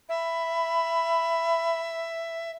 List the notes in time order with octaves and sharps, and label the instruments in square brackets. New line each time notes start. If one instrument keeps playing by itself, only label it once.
[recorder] E5 [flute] B5